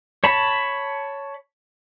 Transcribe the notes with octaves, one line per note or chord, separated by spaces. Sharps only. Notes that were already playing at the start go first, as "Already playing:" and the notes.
C#5 A5 B5